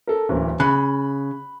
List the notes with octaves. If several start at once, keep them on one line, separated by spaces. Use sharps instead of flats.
A4 A#4
D1 E3 A#3
C#3 B5 F#6